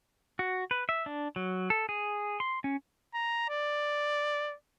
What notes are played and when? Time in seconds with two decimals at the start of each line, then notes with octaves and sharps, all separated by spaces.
0.39 F#4
0.71 B4
0.89 E5
1.06 D4
1.36 F#3
1.70 A4
1.89 G#4
2.40 C6
2.64 C#4
3.14 A#5
3.49 D5